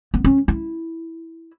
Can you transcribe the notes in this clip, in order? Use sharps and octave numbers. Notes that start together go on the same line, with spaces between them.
B3
C#4
E4